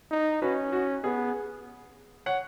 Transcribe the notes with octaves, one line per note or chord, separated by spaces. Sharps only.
D#4
C#4 F#4 B4
F#4
B3 G#4
C#5 F#5